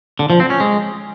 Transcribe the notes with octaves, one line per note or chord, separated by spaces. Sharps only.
D3
F3
C4
C#4
G#3